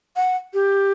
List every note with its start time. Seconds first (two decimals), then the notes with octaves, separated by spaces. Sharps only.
0.16 F#5
0.54 G4